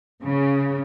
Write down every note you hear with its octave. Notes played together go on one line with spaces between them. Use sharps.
C#3